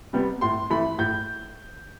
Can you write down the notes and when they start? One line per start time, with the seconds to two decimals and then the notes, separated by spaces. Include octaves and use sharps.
0.13 C3 G3 B3
0.41 A2 C6
0.70 E3 A3 B5
0.99 A2 G6